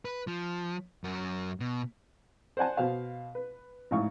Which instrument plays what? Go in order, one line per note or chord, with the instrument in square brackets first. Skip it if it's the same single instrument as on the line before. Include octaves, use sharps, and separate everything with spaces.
[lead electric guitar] B4
F3
F#2 F#4
B2
[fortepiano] C5 D5 F#5 G#5 A5
B2 C5 F5
B4
A1 G#2 F5 C#6